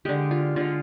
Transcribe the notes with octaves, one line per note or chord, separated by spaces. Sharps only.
D3 G#3 G4
F4
D3 G#3 F4